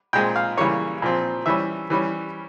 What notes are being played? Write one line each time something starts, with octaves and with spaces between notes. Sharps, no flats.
A#2 G#3 C4 G5
F5
C#3 E3 G3 A#3 C#5
A#2 F3 C4
E3 G3 C#4 E5
E3 G3 C#4